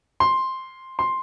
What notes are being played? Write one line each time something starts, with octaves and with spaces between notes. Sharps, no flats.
C6
C6